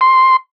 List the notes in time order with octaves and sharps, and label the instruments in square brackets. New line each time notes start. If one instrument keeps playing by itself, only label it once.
[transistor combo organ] C6